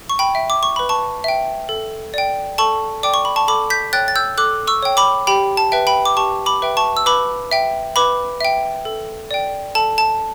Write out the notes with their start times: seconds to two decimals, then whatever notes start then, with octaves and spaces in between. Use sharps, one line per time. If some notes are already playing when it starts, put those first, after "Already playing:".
0.10 C#6
0.19 G5 B5
0.35 E5 G5
0.50 D6
0.63 C#6
0.76 B4 B5
0.89 A5 C#6
1.24 E5 G5
1.69 A4
2.14 D5 G5
2.58 A4 A5 C#6
3.03 D5 G5 D6
3.14 C#6
3.25 B5
3.36 A5 C#6
3.48 A4 B5 D6
3.70 G6 B6
3.93 C#5 G5 F#6 A6
4.08 A6
4.16 E6 G6
4.38 A4 D6 F#6
4.67 C#6 E6
4.83 C#5 G5
4.97 B5 D6
5.27 G4 G5 B5
5.57 A5
5.72 B4 E5 G5
5.87 G5 B5
6.05 D6
6.17 G4 A5 C#6
6.46 B5 D6
6.62 B4 E5 G5
6.77 A5 C#6
6.97 E6
7.06 B4 B5 D6
7.51 E5 G5
7.96 B4 B5 D6
8.41 E5 G5
8.85 A4
9.31 D5 G5
9.75 A4 A5
9.98 A5